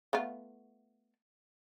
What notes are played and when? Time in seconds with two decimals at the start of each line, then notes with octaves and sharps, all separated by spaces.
0.13 A3 B3 F4